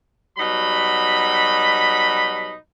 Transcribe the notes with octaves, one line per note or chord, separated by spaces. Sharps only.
B2 F#3 G3 D#4 B5